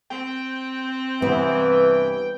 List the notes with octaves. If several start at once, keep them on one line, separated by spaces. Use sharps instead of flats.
C4 G5
G2 C3 E3 B3